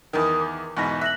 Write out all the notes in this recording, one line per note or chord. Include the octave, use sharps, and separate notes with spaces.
E2 D#3 A#4 D#6
D6
E2 G#2 B2 C#6 A#6 B6
E5 F#6 A#6 F#7